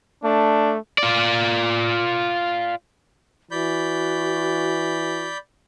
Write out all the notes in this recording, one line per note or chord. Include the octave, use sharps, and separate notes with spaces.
A3 D4
F4 D5
E3 F#4 D5 B5 G6